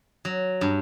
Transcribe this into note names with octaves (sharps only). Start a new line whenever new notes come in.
F#3
G2